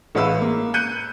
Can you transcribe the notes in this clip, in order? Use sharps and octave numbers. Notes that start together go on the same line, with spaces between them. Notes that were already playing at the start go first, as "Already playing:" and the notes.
A1 G#3 E4 B4 F5 E6
A#3
F#6 G6 C#7 D#7